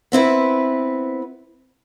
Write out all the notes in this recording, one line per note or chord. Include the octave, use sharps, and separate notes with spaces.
B3 C4 E4 B4